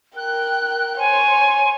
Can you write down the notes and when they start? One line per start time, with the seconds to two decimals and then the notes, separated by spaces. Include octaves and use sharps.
0.17 A#4 G5 F#6
0.98 C5 C#5 G#5